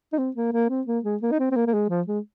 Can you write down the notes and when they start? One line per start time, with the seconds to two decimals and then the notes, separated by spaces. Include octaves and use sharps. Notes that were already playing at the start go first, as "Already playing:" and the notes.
0.13 D#4
0.18 C4
0.36 A#3
0.53 A#3
0.69 C4
0.87 A#3
1.04 G#3
1.22 A#3
1.31 D#4
1.39 C4
1.51 C4
1.56 A#3
1.67 A#3
1.73 G#3
1.89 F3
2.07 G#3